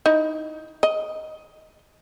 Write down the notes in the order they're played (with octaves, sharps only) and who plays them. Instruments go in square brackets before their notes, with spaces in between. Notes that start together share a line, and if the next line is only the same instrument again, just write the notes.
[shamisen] D#4 E4
D#5